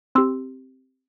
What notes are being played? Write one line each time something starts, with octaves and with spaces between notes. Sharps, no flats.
C4 G4 C6 E6